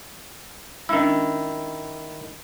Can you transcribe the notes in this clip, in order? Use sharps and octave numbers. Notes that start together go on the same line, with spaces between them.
D#3 G#3 C#4 D4 E4